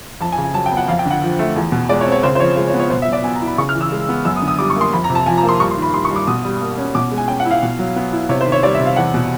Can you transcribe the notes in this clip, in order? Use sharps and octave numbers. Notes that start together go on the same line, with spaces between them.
F2 A5
G#5
C#3
G#5
F#3 A5
G5
B3
F#5
F2 F5
G5
D3
F#5
F3
A3
E2
B2
G#3 D5
C#5
C4
C#5
C#3 C5
C5
F3 C#5
G#3 C5
C#5
B3
C#5
B2 C5
E5
F#3
D5
B3 G#5
A#5
E4
B5
C#3 C#6
F6
E3
E6
G#3
B3
F#2 E6
D#6
D3
D#6
G3 D6
C#6
A#3 C6
F2 B5
A#5
C3
A5
F3 G#5
A#5
A#3
C6
G2 C#6
C6
D#3 B5
G3 C6
C#6
G2
D6
B2 D#6
G3
A#3
C#4
B2 D6
G#3
G#5
C#4 G5
F#5
E4
F5
B2
F#3
B3
E4
C3 C#5
C5
D#3
C#5
G3 D5
E5
C3
F5
E2 F#5
B2